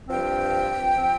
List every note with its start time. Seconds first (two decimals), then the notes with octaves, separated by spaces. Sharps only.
0.08 G2 F3 C4 G5
0.96 F3 C4